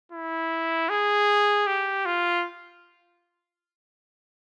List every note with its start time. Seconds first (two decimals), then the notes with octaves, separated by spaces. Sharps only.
0.12 E4
0.89 G#4
1.67 G4
2.05 F4